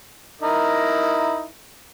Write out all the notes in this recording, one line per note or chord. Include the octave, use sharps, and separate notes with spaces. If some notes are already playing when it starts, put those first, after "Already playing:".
D#4 E4 A#4